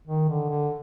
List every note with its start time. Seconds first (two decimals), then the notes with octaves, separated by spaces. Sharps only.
0.07 D#3
0.29 D3
0.50 D3